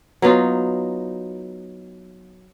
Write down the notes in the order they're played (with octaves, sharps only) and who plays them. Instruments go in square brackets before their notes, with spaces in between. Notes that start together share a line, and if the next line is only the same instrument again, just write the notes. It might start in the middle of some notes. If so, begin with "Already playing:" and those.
[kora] F#3 B3 D#4 F4